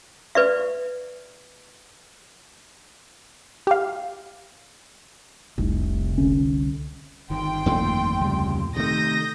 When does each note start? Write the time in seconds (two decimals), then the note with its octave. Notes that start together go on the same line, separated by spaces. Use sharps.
0.35 B4 D5 E5
3.67 G4 F5
5.58 F1 C2
6.18 C2 D3 C#4
7.30 G1 D#3 G5 C6
7.66 F2 A#2 A3
8.21 D2 C#3 G3
8.76 C3 D#3 A3 D#6 G6 A#6